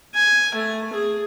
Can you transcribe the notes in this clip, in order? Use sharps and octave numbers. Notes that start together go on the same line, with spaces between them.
G#5
A3
G#4